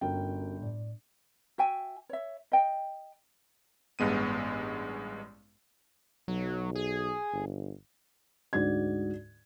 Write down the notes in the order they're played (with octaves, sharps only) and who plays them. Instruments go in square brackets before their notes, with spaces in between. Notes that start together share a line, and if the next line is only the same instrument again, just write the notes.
[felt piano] G1 G5 [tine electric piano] C#4 F#4 A#4
[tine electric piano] A2 D5
[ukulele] F#4 E5 G5 G#5
C#5 E5
D#5 G5
[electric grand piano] A1 G2 G#3 B3 D#7
[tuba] B1 [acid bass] F#3
[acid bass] G#4
[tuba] G1
[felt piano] D2 G#2 F#4 D5 G#6